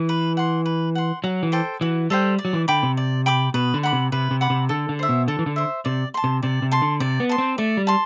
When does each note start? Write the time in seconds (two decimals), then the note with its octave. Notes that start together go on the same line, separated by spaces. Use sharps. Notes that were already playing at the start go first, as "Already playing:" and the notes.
Already playing: E3
0.09 B4
0.37 F#5 C6
0.66 B4
0.95 F#5 C6
1.24 F#3 F#4
1.43 E3
1.52 A4 C5 G5
1.81 E3 F#4
2.10 G3 A4 C5 G5
2.38 D5
2.45 F#3
2.53 E3
2.68 D3 G5 B5 D6
2.83 C3
2.97 D5
3.26 G5 B5 D6
3.54 B2 B4
3.74 D3
3.83 F#5 B5 D6
3.93 C3
4.12 C3 B4
4.31 C3
4.41 F#5 B5 D6
4.50 C3
4.69 D3 A4
4.89 D3
4.99 C5 E5
5.09 B2
5.28 D3 A4
5.39 E3
5.46 D3
5.56 C5 E5
5.85 C3 D5
6.14 A5 C6
6.24 C3
6.43 C3 D5
6.62 C3
6.72 A5 C6
6.82 D3
7.00 C3 D5
7.20 B3
7.29 A5 C6
7.38 C4
7.58 A3 D5
7.77 G3
7.87 A5 C6